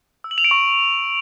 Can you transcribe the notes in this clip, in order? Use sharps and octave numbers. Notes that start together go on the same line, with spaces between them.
E6
F#7
F7
D7
C#6